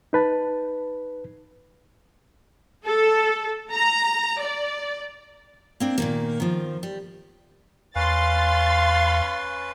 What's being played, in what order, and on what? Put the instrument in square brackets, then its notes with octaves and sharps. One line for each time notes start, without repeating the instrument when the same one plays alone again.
[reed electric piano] D#4 B4 A5
[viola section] A4
A#5
D5
[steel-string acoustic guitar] A#3 C4 D4
A#2 D#3 A#3
D#3 F3
G3
[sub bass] E2 [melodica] C#4 B4 [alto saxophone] F5 [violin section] C6 A6